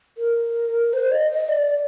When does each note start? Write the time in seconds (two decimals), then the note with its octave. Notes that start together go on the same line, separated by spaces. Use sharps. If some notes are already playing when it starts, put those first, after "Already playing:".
0.18 A#4
0.93 C5
1.11 D#5
1.31 D#5
1.49 D5
1.68 D5